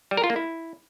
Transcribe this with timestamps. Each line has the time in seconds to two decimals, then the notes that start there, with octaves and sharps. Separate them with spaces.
0.11 G3
0.17 A#4
0.24 F4
0.30 A#3
0.36 E4